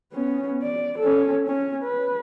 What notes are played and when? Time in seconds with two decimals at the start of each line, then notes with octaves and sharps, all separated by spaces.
0.13 B3 C#4
0.62 D5
0.99 C#4 A4
1.46 C#4
1.83 B4